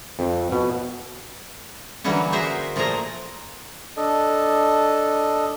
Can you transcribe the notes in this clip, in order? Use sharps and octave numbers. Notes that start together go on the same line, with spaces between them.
F2
B2
D3 E3 F#3 G3 A#3 C#4
F#4 G#4 A#4 C5 E5 G5
A#2 F3 A3 G#4 A#4 A#5
D4 A4 D#5